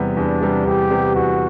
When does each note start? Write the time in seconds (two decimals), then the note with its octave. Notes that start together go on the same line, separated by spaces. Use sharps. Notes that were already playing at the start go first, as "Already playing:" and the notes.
Already playing: E2 C3 G3 B3
0.17 E2 D4
0.42 C3 G3 B3
0.66 E2 G4
0.91 C3 G3 B3
1.16 E2 F#4